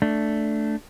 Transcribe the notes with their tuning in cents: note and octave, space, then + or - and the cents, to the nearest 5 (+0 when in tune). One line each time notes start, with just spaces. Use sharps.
A3 +0 D4 +0